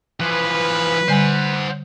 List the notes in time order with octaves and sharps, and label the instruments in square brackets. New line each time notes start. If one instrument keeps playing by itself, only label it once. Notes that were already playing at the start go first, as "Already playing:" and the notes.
[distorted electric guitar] E3 F3 [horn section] B4
[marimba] D3 G3 G#5 [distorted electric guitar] C5 F#5